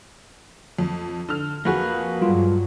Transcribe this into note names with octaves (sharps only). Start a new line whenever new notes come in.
F2
D3 F6
F2 A#3 F#4 G#4 B4
G2 F#3 G3 F4